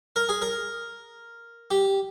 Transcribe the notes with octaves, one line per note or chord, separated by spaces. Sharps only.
A#4
G#4
A#4
G4